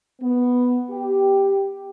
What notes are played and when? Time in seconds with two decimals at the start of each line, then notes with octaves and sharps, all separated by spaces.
0.22 B3
0.91 G4